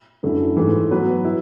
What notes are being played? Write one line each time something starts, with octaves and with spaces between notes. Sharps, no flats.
F#2 D3 A3 E4
G#2 E3 A3
F#3 B3 F#4 B4
E4